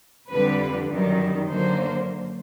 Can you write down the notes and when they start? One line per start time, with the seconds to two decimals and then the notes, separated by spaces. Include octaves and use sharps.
0.30 F2 D3 G3 B4
0.90 F#2 D#3 G3
1.49 F#2 D3 F#3 A#3 C5